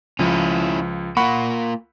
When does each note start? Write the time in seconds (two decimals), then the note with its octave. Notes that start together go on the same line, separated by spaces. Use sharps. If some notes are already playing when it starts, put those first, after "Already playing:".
0.19 C#2 F3 C#4 E4
1.17 A#3 F4 F#5 B5 C#6